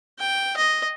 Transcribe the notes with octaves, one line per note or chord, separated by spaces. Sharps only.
G5
D#5